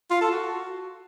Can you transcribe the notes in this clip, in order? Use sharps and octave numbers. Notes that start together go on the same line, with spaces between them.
F4
A4
F#4